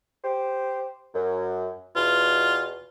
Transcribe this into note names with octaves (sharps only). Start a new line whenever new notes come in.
G4 C5
F#2
E2 B2 F4